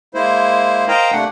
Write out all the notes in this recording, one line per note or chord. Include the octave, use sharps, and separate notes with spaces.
G#3 A#3 E4 C5
A#4 C5 D#5 F5 G5 A#5
C3 A3 A#3 D4 F#5